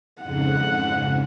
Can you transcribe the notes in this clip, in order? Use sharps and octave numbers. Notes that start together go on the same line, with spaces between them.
F2 G#2 C#3 F#5